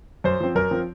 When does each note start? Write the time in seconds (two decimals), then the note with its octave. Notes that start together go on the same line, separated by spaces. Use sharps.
0.24 F#2 C5
0.40 F3 C4
0.55 F#2 A#4
0.71 F3 C4